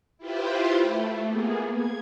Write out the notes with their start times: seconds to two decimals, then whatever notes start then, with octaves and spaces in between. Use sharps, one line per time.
0.18 E4 F4 G4 B4 C5
0.80 A3
1.27 A#3 B3 G#4
1.71 G#6